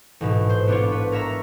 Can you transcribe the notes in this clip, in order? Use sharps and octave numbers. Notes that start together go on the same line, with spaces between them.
A1 G#2 B2
C5
B3 D4 F4 C#5
B4
A#4 C#5 E5 A#5